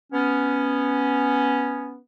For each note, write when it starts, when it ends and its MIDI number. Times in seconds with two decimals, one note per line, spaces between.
0.12 1.97 59
0.12 1.97 61